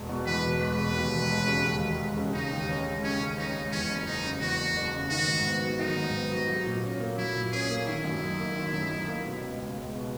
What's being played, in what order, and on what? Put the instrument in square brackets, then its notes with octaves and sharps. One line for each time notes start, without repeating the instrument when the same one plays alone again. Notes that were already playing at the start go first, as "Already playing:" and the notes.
Already playing: [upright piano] E1 E2 G#3
B2
[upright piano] E2 [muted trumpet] B4
[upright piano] E1
[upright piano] G#3 [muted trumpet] B4
[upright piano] B2
D#2
E1
G#3
C#3
D#2
E1
G#3
C#3
[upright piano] C#3 [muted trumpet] D#4
[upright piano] D#2
C#4
G#3
[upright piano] C#3 [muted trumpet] C#4
[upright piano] D#2
[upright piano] C#4 [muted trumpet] D#4
[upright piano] G#3
[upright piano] E2 [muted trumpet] C#4
[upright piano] F#1
[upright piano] F#1 [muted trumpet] D#4
[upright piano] C#3
[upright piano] E2 [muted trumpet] F#4
[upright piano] F#1
F#1
C#3
[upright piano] D#3 [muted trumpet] F#4
[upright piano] G#2
B3
F#3
[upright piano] D#3 [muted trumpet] D#4
[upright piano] G#2
B3
F#3
F#3
A#2
C#4
A#3
[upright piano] F#3 [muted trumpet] E4
[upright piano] A#2
[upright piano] C#4 [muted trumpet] G#4
[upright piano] A#3
[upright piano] D#3 [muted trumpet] E4
[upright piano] F#2
D#4
A#3
D#3
F#2
D#4
A#3
B2
C#2
C#2
G#3
B2